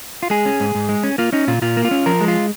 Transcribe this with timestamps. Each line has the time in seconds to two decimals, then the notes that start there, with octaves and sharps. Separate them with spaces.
0.23 F4
0.30 G#3 G#4
0.46 C#4
0.60 G#2
0.75 G#2
0.89 G#3
1.03 C#4
1.18 A#3 F4
1.32 C#4 D#4
1.47 A#2 F4
1.62 A#2 F4
1.77 A#3
1.85 F4
1.91 C#4
2.06 F3 A#4
2.21 G#3
2.28 F4